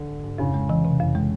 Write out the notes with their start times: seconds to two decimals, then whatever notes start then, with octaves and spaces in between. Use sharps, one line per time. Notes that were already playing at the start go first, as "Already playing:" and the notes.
Already playing: D3
0.08 G#2
0.24 G#2
0.38 F2 C#3
0.54 G#3
0.69 E3
0.85 C3
1.00 F2
1.15 G#3